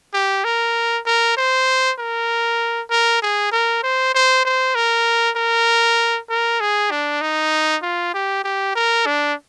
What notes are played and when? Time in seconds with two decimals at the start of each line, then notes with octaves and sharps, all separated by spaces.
0.13 G4
0.44 A#4
1.06 A#4
1.37 C5
1.99 A#4
2.91 A#4
3.22 G#4
3.52 A#4
3.83 C5
4.14 C5
4.45 C5
4.75 A#4
5.36 A#4
6.30 A#4
6.60 G#4
6.91 D4
7.21 D#4
7.82 F4
8.14 G4
8.44 G4
8.75 A#4
9.06 D4